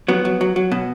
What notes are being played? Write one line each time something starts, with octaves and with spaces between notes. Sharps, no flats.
F#3 B3
F#3
F#3
F#3
B2